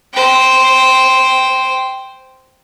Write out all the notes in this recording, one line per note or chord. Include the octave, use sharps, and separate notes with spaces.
C5 G5